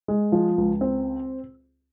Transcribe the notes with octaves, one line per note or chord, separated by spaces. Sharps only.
G#3
F3
C#2
C4